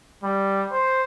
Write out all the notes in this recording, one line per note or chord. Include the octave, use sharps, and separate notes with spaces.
G3
C5